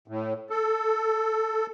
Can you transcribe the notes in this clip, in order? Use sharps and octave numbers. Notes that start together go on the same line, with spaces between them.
A2
A4